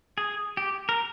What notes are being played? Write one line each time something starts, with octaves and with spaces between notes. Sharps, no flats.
G#4
G4
A#4